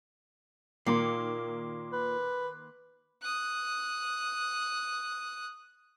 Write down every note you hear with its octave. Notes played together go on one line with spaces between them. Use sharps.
A#2 D#3 A#3 C6 D6 C7
B4
D#6 F#6